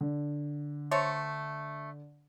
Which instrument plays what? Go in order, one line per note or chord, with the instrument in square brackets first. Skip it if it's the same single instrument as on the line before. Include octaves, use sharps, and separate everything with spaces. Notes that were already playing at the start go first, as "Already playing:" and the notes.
[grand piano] D3
[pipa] A3 C5 C#5